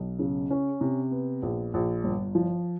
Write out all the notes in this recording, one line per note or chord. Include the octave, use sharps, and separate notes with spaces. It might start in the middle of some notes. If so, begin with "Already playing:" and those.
Already playing: B1
C#3
C#4
C3
B3
A#1
A#1
G1
F3